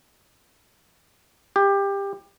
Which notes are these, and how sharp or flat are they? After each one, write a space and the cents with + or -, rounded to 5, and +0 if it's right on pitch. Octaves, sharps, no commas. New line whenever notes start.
G4 +20